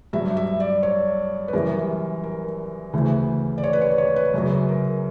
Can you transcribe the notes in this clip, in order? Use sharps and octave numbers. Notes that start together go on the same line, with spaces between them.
G2 F#3 E5
E5
D5
C#5
B4
F#2 E3 G3 A#4
A#4
D2 C#3 E3
D5
C#5
B4
C#5
C#5
B4
F#2 C#3 F#3 B4
A#4